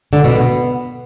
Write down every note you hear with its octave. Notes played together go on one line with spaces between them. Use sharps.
D3
B2
B3